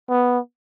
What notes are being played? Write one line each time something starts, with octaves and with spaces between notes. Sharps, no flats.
B3